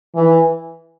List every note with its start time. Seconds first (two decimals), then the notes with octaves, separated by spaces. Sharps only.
0.15 E3